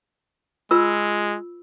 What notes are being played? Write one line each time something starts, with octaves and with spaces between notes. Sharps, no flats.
G#3 F4 B4 E6